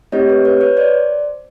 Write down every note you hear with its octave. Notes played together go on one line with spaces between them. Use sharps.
A3 C4 E4 G4 C#5 D#5
B4 C#5
B4 C#5
B4 C#5
C5 D5